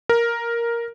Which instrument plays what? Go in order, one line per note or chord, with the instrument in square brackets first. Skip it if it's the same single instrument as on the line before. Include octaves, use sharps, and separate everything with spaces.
[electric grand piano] A#4